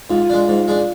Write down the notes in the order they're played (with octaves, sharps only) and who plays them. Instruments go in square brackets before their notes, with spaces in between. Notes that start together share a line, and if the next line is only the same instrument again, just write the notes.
[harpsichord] G#2 [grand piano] F4
[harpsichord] G#3 D4
G#2
G#3 D4